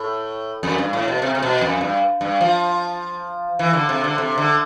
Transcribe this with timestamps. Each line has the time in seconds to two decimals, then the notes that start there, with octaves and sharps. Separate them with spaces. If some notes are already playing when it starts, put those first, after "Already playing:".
Already playing: A2
0.63 F2
0.78 G2
0.93 A2
1.08 B2
1.22 C3
1.35 C3
1.42 B2
1.61 F2
1.81 G2
2.21 G2
2.41 F3
3.59 E3
3.73 D3
3.89 C3
4.04 D3
4.18 C3
4.38 D3